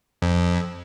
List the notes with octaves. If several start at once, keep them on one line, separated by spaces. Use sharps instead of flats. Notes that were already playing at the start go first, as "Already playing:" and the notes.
F2